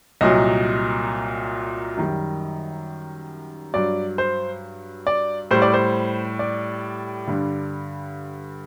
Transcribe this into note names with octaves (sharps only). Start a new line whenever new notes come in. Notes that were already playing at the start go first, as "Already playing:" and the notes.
C2 A#2 F#3 D#5
F#2 D#3 G3
G2 F#3 D5
C5
D5
A2 G3 C5
D5
C5
D5
G2 D3 G3